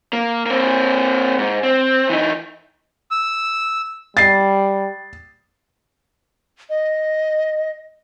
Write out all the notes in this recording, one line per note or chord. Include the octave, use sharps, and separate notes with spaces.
A#3
A#3 C4
G#2
C4
E3 D#4
E6
G3 A6 C7
D#5